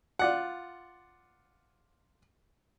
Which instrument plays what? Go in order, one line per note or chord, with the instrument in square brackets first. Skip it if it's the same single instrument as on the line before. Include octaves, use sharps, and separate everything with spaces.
[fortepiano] F4 D5 F#5